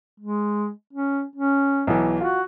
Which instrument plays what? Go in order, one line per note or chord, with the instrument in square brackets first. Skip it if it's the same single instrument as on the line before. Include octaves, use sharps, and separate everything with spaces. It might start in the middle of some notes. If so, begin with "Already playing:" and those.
[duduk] G#3
C#4
C#4
[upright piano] B1 E3
[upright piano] F4 [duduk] F#4